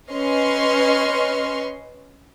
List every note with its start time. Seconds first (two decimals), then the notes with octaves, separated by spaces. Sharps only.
0.12 C#4 B4 D#5 C6 C#6 F6